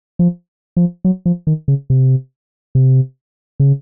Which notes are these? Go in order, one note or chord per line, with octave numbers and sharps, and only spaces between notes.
F3
F3
F#3
F3
D#3
C#3
C3
C3
C#3